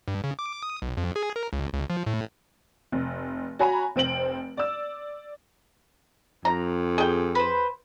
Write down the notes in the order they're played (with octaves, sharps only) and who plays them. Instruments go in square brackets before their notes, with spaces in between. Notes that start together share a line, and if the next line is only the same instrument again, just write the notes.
[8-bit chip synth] G2
C#3
D6
D#6
B1
F2
G#4
A#4
C#2
C#2
F3
A2
[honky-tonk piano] F1
F#4 C#5 G#5 A#5 B5
F1 C4 D7 F#7
D5 E6
[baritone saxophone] F2 [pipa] A#5
[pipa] G#4 G5
[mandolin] B4 C5